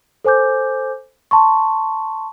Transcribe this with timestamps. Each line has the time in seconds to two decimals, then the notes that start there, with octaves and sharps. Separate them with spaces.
0.25 A4 C5 G#5 D6 G6
1.31 A5 C6 C#6